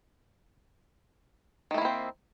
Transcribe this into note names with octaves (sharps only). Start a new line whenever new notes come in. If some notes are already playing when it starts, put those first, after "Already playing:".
D#3 A3 A#3 C4 E4